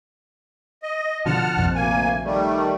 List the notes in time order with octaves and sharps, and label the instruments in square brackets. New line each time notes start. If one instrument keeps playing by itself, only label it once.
[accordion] D#5
[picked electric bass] B2 D3 F3 [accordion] F#5 A5 F6
[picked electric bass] A#1 F2 C3
[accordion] D2 A#3 G#5
D#3 G3 A3